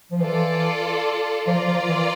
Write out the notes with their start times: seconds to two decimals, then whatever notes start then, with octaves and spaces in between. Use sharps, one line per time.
0.12 F3
0.21 E3 F4 A4 D5
1.47 F3 F4 A#4 D5
1.67 F3
1.88 E3